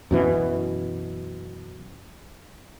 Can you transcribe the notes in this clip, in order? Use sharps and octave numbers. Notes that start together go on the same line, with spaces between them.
F#2 B2 E3